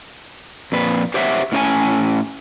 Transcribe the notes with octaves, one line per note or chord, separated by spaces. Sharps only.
F2 A#2 B4
G4 C5 C#5 E5 F#5
A2 C#4 D#5 G#5